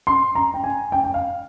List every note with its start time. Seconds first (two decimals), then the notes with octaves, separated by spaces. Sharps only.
0.07 C6
0.35 A#5
0.54 G5
0.64 G#5
0.92 G5
1.04 G5
1.14 F5